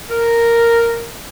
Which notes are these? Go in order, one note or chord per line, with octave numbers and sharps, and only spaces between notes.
A#4